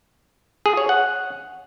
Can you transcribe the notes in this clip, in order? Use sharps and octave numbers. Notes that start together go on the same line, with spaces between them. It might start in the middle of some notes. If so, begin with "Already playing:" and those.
G#4
C#5
F#5